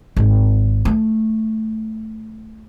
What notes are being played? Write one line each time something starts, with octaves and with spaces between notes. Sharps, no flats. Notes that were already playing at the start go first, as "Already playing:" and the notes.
G#1
A3